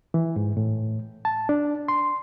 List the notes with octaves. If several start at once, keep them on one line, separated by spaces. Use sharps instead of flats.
E3
G#2
A2
A5
D4
C6